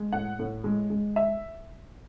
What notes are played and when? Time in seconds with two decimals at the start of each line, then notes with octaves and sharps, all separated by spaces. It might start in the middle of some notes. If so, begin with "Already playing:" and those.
Already playing: G#3
0.12 A2 F#5
0.39 A2
0.64 G#3
0.90 G#3
1.16 E5